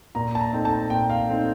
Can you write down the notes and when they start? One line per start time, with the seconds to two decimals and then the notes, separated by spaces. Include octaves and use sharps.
0.15 A#2 A#5
0.35 A5
0.40 A#5
0.53 A3 C4 D#4
0.65 A5
0.90 A#2 G5
1.10 F5
1.28 A3 C4 D#4